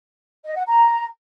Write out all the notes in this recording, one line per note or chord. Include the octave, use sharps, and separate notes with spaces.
D#5
F#5
A#5